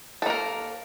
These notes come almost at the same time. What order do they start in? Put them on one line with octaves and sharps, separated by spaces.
A4 A#3 A#4